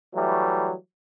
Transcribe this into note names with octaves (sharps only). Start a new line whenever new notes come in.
E3 F#3 G3 A3